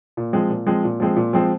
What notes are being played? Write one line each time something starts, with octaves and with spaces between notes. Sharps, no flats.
A#2
F3 G#3 C4
A#2
F3 G#3 C4
A#2
F3 G#3 C4
A#2
F3 G#3 C4